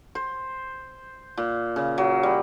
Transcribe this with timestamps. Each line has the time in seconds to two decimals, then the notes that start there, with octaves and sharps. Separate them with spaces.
0.15 C5
1.37 A#2
1.76 C#3
1.98 F#3
2.23 G3